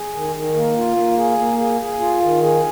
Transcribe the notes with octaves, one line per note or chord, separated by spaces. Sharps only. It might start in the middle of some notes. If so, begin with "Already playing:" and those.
Already playing: G#4
D#3
D#3
A#3
F4
A#3
G#4
A#3
G#4
G#4
F4
D#3
G#4